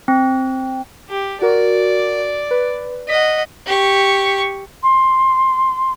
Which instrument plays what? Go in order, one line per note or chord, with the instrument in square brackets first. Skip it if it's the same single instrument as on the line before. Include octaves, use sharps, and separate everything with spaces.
[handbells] C4
[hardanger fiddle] G4
[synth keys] F#4 A#4 [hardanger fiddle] D5
[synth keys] B4
[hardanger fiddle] D#5 F#5 [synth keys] B6
[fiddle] G4 C#6
[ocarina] C6